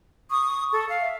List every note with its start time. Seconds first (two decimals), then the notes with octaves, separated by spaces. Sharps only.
0.31 C#6 D#6
0.73 A4
0.89 F5
1.02 E5